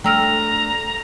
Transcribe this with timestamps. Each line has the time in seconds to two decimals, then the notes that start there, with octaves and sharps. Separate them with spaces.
0.04 A3 D4 G5 A#5 E6 F6